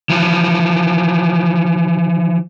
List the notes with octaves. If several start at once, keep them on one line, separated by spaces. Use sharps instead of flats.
E3 F3